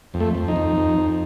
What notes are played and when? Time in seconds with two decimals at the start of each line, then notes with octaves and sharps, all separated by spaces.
0.14 F2
0.20 A3
0.34 F2
0.48 D#4
0.56 F2
0.77 F2
0.98 F2